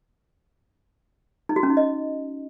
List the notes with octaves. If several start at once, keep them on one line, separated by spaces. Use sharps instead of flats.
D#4
F#4
C#4
D#4
D#5